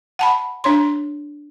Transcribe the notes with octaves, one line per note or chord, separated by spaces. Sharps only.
F#5 A5 B5
D4 C#5 C6